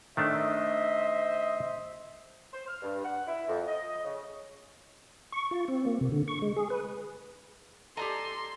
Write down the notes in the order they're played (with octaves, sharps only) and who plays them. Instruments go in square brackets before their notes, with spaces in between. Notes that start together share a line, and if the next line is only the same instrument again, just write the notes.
[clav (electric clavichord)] D#3 A3 D4 [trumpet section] C5 D#5 E5
[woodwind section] C5
F6
G2
F#5
E4
F2
D#5
C#3
[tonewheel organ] C#6
F4
C4
A#3
C3
D3
C#6
G#3
G#4
B4
[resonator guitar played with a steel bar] G4 D5 D#5 [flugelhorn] A4 [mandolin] G#5 A#5 [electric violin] C6